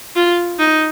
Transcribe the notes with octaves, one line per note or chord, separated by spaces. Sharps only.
F4
D#4